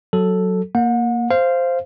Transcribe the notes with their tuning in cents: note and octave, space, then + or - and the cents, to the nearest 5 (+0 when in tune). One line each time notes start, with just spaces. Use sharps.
F#3 +0 A4 +0
A#3 +0 F#5 -40
C5 +0 F5 -15